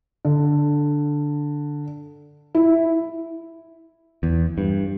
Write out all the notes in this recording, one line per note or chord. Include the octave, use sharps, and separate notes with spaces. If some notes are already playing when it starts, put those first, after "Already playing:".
D3
E4
E2
G2